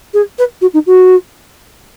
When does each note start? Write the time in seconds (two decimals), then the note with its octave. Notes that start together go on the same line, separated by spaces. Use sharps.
0.14 G#4
0.38 B4
0.61 F#4
0.73 D#4
0.86 F#4